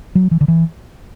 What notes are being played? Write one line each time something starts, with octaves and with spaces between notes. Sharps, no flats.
F#3
E3
D3
E3